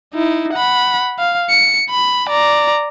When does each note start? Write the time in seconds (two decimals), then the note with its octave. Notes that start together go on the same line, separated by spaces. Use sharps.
0.14 D#4 E4
0.54 F#5 B5
1.19 F5
1.50 C#7
1.91 B5
2.29 D5 A#5